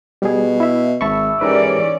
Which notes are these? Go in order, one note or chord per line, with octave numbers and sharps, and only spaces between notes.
B2 G3 G#4
E4 E5
G#1 E5 A5 B5 C#6
G#2 E3 C#4 G4 A#4 B4 D5